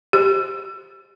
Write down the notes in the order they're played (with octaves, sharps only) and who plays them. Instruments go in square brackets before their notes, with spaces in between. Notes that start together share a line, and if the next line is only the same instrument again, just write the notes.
[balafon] G4